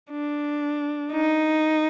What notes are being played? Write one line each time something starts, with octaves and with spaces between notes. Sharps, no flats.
D4
D#4